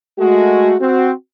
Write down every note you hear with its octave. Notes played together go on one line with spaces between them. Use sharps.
G#3 A3 F#4
C4 F#4